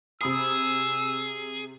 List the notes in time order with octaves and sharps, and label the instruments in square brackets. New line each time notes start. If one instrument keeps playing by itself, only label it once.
[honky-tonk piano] C3 B5 D#6 [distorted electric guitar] G#4 [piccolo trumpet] E6